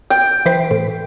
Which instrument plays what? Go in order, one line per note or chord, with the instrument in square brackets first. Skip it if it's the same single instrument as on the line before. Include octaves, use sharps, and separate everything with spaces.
[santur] G5
[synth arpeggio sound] E3 B4 C5
A2